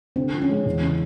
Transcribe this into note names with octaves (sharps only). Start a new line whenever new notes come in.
D3 C4
F3
C#4
G#3
E2
C#3